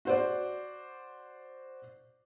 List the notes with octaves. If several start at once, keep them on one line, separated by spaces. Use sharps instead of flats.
F#4 C5 D5